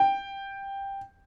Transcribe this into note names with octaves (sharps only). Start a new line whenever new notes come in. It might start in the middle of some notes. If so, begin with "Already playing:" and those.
Already playing: G5